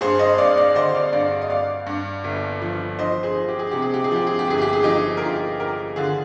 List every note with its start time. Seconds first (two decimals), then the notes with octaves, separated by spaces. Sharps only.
0.01 G2 G#4 C5
0.19 C5 D#5
0.38 G2 D5 F5
0.57 D5 F5
0.75 D3 C5 D#5
0.94 D5 F5
1.13 G2 D5 F5
1.42 D#5
1.50 G2 D5 F5
1.87 G2
2.24 G1
2.62 F3
2.99 F3 C5 D#5
3.23 G#4 C5
3.36 F3
3.49 G4
3.59 G#4
3.71 C3 G4
3.82 G#4
3.94 G4
4.04 G#4
4.11 F3 G4
4.27 G#4
4.39 G4
4.47 G1 G#4
4.62 G4
4.73 G#4
4.83 F3 D#4 G4
5.17 A#4
5.22 G1 F4 G#4
5.59 F3 G4 A#4
5.96 D3 F4 G#4